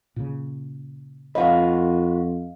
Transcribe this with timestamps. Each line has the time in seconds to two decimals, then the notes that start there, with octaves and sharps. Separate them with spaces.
0.16 A#2 C#3
1.35 F2 F4 F#4 B4 D#5 F5